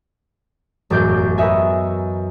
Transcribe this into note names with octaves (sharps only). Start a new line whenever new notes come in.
E1 A1 F#2 D6 G6 C7
A#4 B4 C#5 D#5 E5 G#5